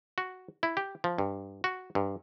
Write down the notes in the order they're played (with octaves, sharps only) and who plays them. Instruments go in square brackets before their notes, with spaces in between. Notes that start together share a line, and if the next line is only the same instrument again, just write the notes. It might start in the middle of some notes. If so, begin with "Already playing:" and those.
[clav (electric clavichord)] F#4
E4
G4
F3
G2
F#4
G2